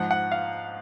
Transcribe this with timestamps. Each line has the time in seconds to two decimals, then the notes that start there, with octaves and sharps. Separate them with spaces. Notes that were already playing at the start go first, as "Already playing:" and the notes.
Already playing: G#2 F3 F#5
0.11 F#5
0.32 F5